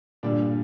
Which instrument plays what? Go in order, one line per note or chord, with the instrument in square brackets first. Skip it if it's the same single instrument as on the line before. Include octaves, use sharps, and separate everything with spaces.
[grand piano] G2 D3 G3 D4 [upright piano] A#2